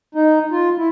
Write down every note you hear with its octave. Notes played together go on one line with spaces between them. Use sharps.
D#4
F4
E4